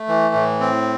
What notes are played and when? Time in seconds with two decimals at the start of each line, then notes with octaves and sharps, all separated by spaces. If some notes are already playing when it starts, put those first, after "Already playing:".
Already playing: A3
0.08 E3
0.34 A2
0.60 C4